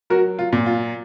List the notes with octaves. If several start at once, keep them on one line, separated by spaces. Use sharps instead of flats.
F#3 F#4 A#4
F4
A#2
F4